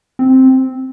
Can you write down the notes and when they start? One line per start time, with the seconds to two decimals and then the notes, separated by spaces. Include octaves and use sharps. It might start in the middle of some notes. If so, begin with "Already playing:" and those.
0.19 C4